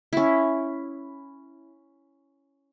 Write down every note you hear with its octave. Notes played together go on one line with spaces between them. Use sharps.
C#4 E4